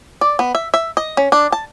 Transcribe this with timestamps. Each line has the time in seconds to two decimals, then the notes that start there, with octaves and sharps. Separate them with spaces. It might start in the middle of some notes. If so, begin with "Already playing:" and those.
0.21 D5
0.39 B3
0.55 E5
0.74 E5
0.97 D#5
1.17 C#4
1.32 D4
1.52 A5